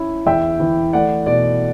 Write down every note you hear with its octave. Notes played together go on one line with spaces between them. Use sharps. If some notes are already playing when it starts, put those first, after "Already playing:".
Already playing: C#4 E4
E2 E5 G5
E3
A3 D5 F#5
B2 D5